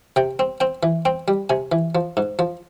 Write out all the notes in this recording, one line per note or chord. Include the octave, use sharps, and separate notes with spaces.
C3 G5
C4
C4 G5
E3
C4 G5
G3
C3 G#5
E3
F3
G#2
F3